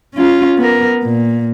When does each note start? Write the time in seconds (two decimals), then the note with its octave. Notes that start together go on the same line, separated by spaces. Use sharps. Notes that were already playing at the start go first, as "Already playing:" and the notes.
0.15 C#4 F4
0.57 B3 A#4
1.03 A#2